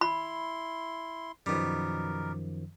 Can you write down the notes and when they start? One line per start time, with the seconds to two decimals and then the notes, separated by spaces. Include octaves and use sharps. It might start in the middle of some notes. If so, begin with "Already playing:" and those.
0.01 E4 B5 C6
1.46 F#2 B2 D#3 F3 G3 A#4